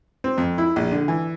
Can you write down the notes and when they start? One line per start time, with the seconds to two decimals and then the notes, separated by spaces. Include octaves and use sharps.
0.24 C4
0.38 F2
0.58 E4
0.76 A#1
0.92 D3
1.08 E3